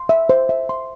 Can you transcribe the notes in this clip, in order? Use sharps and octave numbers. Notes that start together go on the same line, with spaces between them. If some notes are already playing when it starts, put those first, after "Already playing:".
Already playing: C6
E5
C5
E5
C6